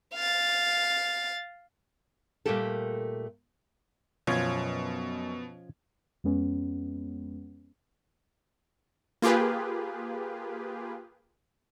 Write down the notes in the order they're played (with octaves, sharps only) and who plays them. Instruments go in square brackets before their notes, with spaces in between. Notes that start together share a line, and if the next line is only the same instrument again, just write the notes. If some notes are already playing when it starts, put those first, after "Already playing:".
[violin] F5 A6
[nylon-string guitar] A#2 G3 A3 A#3 G4 A4
[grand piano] F#2 C#5 G#6 [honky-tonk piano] B2 [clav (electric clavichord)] F3 C#4 F4
[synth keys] F2 G#3 B3 C#4
[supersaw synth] A#3 F4 G4 G#4 B4